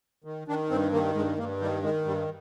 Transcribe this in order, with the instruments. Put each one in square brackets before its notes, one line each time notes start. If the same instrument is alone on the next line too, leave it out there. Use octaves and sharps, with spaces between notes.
[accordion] D#3
D#3 D4
G2 C4
D#3 A#3
G2 G#3
G2 A#3
D#3 G3
D#3 G#3
G2 G3